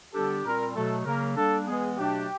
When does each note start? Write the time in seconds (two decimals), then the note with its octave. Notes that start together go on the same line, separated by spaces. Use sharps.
0.13 D3 G3 B3 D4 G4 A4
0.44 A#2 G3 C4 F4 A#4
0.75 B2 F#3 A3 A4
1.05 C#3 F#3 A#3 A#4
1.36 G3 A#3 D4 A4
1.66 E3 G#3 B3 G#4
1.97 B2 F#3 A3 D4 G4